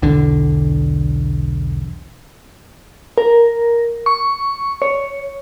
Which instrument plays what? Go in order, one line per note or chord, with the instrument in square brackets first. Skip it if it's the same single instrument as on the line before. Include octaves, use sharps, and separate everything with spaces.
[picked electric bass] B1 E2 D3
[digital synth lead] A#4
C#6
C#5